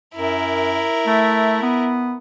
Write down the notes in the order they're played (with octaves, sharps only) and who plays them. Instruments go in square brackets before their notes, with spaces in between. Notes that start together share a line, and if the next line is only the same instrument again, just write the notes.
[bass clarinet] F#2 [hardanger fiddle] E4 A#4
[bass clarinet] A3
B3